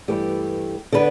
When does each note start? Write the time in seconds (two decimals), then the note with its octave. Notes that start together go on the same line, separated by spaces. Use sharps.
0.08 G2 E3 A3 G4
0.92 D3 B3 D4 B4